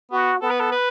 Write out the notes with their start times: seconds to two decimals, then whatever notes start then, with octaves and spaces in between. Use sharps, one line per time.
0.12 B3 F#4
0.42 B3 A4
0.51 B4
0.60 A4
0.72 B4